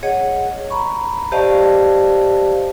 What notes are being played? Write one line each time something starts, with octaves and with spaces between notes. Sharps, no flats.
G#4 C#5 D#5 F#5
A#5 B5 C#6
G4 C5 D5 D#5 F5 A5